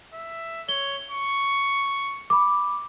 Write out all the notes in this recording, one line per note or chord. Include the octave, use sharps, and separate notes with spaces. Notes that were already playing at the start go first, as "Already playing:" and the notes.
E5
C#5 G7
C#6
B5 D6